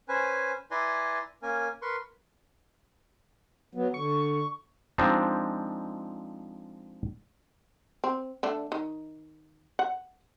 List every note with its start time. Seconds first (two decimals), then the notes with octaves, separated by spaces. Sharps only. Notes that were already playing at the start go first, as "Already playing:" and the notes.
0.09 C#4 B4 C5 G#5
0.71 E4 B4 D5 G#5 A#5 C6
1.42 A#3 C#4 A#4 G#5
1.82 A#4 B4 C6 C#6
3.75 F#3 B3
3.94 D3 C#6
4.98 F3 G#3 C4 D4 D#4
8.04 C4
8.43 D3 A3 D4
8.72 D#3
9.79 F#5